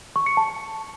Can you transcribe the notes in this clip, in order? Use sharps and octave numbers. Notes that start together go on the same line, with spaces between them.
C#6
C#7
A5